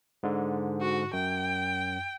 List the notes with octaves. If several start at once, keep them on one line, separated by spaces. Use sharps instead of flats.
G#2 D3
F#4
F#2 G5